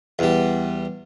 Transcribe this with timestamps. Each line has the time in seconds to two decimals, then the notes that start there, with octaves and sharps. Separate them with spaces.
0.19 E2 G3